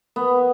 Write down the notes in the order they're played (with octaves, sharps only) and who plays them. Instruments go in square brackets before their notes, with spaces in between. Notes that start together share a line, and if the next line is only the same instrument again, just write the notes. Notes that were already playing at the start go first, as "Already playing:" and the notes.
[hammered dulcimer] B3